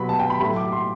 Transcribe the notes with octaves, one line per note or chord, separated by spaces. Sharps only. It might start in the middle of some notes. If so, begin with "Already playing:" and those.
Already playing: B2 F#3 B3 B5
A5
G5
B5
A2 F#3 A3 B5
D6
C6